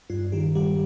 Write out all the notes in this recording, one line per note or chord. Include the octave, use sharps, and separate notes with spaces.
G2 F4
D#3 G4
G3 G4